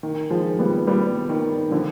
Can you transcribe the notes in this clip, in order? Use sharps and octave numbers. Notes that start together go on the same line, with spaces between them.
D#3
F3 G#3
G3 B3
G3 B3
D#3
D3 F3